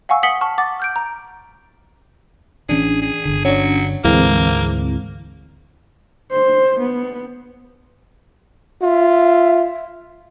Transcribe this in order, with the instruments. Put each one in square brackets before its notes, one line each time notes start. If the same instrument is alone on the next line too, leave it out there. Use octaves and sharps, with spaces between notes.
[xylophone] F5 F#5 G#5 C#6 E6
F#5 D#6 B6 C#7 F#7 G7
A5 C#6 F6
F#5 D6 A6
F6 G6 D7
A#5
[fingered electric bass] A1 E3 C#4 [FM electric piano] D4 [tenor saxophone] G#4
[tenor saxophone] G#4
[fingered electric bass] G1 D3
[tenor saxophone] F#3 [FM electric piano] C#4 D4
[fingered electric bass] D2 G#2 [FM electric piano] E3 G#3 C4 [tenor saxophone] A#3
[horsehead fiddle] C5
B3
[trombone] F4 [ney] E5